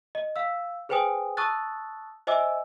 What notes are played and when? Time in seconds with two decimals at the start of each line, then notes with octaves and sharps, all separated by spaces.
0.15 D#5
0.36 F5 E6
0.89 G#4 B4 C5 G5 G#5 D#6
1.37 A5 C#6 D#6 E6 F#6 A6
2.27 C5 D#5 E5 G#5 D6 E6